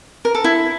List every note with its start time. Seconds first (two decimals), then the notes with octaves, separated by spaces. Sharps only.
0.25 A#4
0.35 A4
0.44 E4